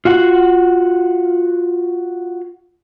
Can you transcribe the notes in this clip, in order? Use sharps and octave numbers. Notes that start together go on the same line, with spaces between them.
F4 F#4 F#5